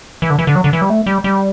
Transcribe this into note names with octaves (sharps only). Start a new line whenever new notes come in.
E3
D3
E3
D3
F#3
D3
E3
G3
A3
G3
G3